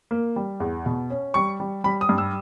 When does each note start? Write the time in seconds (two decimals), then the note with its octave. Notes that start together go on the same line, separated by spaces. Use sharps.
0.11 A#3
0.36 G3
0.60 E2
0.86 B2
1.10 C#4
1.34 G3 C#6
1.60 G3
1.84 G3 B5
2.01 D#6
2.09 G2
2.18 E6